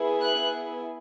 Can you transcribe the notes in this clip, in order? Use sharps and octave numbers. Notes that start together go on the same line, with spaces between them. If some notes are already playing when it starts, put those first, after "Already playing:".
Already playing: B3 E4 G#4
F#6